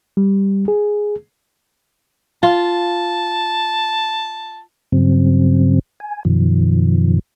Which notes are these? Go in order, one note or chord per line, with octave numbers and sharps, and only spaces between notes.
G3
G#4
F4 A5
G2 C#3 F#3 C4
G#5
F#2 B2 D#3 F3